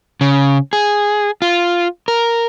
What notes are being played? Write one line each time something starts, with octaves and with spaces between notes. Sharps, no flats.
C#3
G#4
F4
A#4